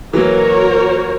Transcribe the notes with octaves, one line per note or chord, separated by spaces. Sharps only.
E3 F#3 A#3 F#4 A#4 C#5